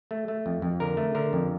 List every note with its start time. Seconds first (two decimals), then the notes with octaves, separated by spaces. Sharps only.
0.11 A3
0.28 A3
0.46 F2
0.62 F2
0.80 D3 A#4
0.97 A3
1.15 D3 A#4
1.33 F2